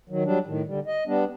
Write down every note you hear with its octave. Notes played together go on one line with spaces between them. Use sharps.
D#3 F#3
F#3 G3 D4
A2 D#3
D3 G3
D#5
G3 B3 D4